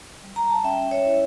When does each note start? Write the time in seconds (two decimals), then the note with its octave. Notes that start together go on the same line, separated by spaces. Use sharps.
0.23 G3
0.36 A#5
0.50 A5
0.64 C#4 E5 G5
0.91 C#5 E5
1.05 E4